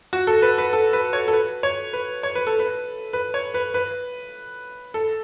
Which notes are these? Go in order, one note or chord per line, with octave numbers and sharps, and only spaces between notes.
F#4
A4
B4
B4
A4
B4
C#5
A4
B4
C#5
B4
C#5
B4
A4
B4
B4
C#5
B4
B4
A4